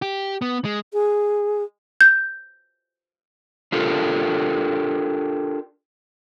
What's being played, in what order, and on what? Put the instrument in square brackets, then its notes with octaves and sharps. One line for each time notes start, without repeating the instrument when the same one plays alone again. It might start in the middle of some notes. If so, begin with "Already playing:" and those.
[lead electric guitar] G4
B3
G#3
[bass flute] G#4
[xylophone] G6
[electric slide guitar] D4 F4 G4 A4 A#4